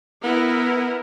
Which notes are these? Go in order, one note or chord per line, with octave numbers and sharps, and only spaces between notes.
B3 E4 A#4